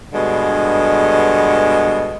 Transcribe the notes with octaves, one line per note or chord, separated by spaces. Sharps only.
G2 B2 D3 G#3